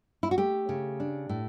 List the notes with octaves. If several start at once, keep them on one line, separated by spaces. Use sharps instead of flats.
E4
F#4
A3 G4
C#3
D4
A2